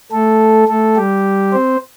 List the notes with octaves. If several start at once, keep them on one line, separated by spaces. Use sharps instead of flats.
A3 A4
A3 A4
G3 G4
C4 C5